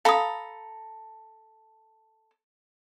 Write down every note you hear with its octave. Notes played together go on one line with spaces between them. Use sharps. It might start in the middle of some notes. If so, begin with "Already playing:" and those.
A4 F5 A#5 B5 D#6